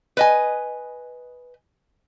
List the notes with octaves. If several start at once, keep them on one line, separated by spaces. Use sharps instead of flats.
B4 D#5 G#5